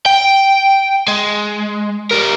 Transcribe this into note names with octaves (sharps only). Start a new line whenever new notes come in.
G5
G#3
G3 A#4